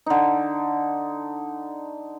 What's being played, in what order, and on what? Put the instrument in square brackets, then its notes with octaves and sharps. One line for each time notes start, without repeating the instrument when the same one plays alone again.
[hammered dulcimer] D3 D#4